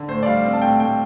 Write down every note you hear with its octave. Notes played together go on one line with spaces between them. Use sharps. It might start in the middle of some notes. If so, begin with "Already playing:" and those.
Already playing: D3
A2 C5
D5
G3 F5
C4
A5
A2 G5
A2 G5